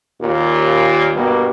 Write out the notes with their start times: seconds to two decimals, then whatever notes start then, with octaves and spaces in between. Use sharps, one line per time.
0.21 D#2 A#2
1.15 G2 B2 G3 A#3